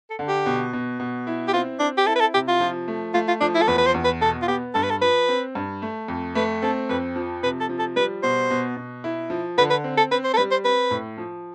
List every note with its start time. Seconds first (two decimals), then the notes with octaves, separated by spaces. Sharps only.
0.10 A4
0.19 D3
0.28 G4
0.46 B2
0.73 B2
1.00 B2
1.27 E4
1.48 G4
1.53 C4 F4
1.80 C4 D4
1.97 G4
2.06 E4 A4
2.16 B4
2.20 A4
2.34 C3 G4
2.48 F4
2.60 F3
2.88 A3
3.14 A3 F4
3.28 F4
3.41 F3 D4
3.54 E4
3.62 A4
3.68 E2 B4
3.78 B4
3.86 C5
3.94 E2
4.04 B4
4.21 B2 A4
4.42 F4
4.48 B3 G4
4.74 G2 A4
4.83 B4
4.90 A4
5.01 F3 B4
5.28 C4
5.55 G2
5.82 A3
6.08 F2
6.35 A3 B4
6.62 C4 A4
6.89 F2 B4
7.16 F3
7.43 C3 B4
7.60 A4
7.69 F3
7.79 A4
7.96 G3 B4
8.23 B2 C5
8.50 B2
8.77 B2
9.04 E4
9.30 F3
9.58 D3 B4
9.70 B4
9.84 C4
9.97 A4
10.11 C4 B4
10.24 C5
10.33 A4
10.37 G3 B4
10.51 C5
10.64 C4 B4
10.91 A2
11.17 F3